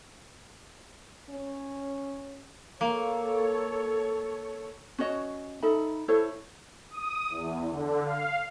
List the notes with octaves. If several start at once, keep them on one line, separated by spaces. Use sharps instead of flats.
C#4
A#3 A4 C#5
C#4 F#4 C#5 D#5
D#4 A4 E5 B5
E4 A4 C5 C#5
D#6
E2
D3
F5